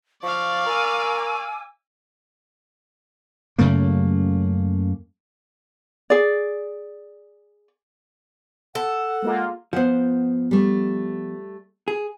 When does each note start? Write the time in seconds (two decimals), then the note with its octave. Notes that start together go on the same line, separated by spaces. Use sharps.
0.23 F3 D5 F5 C#6
0.66 A#4 G#5 D6 E6
3.58 F#2 C#3 A3 A#3
6.10 G#4 D5
8.75 A4 F#5
9.22 G#3 A#3 F4
9.73 F3 B3 C5 F#5
10.51 G3 A3
11.88 G#4